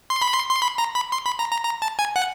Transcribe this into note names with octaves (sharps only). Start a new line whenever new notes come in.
C6
B5
C6
C6
B5
A#5
B5
C6
B5
A#5
A#5
A#5
A5
G#5
F#5